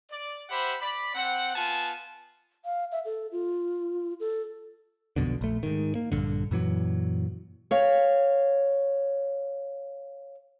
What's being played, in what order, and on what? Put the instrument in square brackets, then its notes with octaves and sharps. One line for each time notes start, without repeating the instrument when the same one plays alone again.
[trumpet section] D5
G4 C5 E5 F#5 B5
D5 B5
C4 F#5
B3 F4 G#5 A5
[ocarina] F5
E5
A4
F4
A4
[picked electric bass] B1 F2 B2 D3
A#1 A3
G#2 D#3
A#3
A#1 G2 D3
F#2 A#2 E3 F#3
[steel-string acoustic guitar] C#5 F5